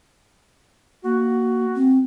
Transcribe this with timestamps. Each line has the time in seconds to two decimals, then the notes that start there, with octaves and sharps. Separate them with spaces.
1.04 A#3 F#4
1.75 C4